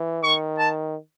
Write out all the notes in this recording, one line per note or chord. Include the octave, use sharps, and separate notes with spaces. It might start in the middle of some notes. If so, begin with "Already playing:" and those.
Already playing: E3
D#3 C#6
A5